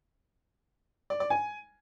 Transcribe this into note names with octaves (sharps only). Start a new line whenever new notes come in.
D5
D5
G#5